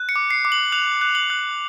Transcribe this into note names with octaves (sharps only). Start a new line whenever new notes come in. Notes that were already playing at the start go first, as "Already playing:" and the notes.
Already playing: F#6
C#7
D6
C7
D6
F#7
F#6 F7
F#6
F#7
F#6